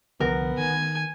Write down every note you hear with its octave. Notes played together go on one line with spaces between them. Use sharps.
C2 D3 F3 B3 A#4
D#3 G#5